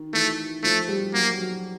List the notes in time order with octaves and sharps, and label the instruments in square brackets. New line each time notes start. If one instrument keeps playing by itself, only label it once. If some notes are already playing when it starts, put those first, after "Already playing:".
Already playing: [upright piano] D#3
[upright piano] E3 [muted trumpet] A3
[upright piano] F3 [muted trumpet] A3
[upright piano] G3
[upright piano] F#3 [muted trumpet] A#3
[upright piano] F#3